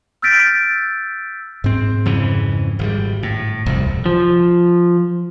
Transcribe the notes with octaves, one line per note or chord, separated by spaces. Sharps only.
E6 F6 G6 A6 B6 D7
G#2 C4
F2 C#3 E3
G#1 C3 G3
A2
D#1 C2 F2 C3
F3